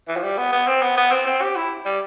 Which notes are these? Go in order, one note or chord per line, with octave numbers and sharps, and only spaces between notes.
E3
F3
G3
B3
B3
C4
B3
B3
C4
C4
G4
E4
G3